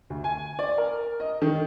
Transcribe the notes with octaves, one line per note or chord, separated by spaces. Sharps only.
D2
G#5
D5
A#4
D#5
D#3